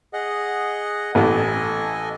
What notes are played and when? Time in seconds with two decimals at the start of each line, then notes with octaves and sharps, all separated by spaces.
0.13 G#4 D#5 F#5
1.15 A1 A4 D#5 G#5